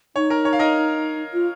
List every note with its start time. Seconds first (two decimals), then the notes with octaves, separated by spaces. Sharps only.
0.16 D#4 C#5
0.30 A#4
0.45 C#5
0.53 F5
0.59 A#4 D#5
1.34 F4